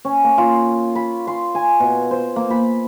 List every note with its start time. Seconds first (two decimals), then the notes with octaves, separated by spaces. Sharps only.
0.05 C#4
0.24 A#3
0.38 F4
0.95 B5
1.27 C6
1.55 G#5
1.80 B2
2.11 C5
2.36 A#3
2.50 B5